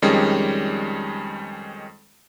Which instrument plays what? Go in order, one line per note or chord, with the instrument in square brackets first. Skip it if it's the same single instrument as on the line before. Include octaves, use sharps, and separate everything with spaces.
[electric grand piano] F2 D#3 G3 G#3 C#4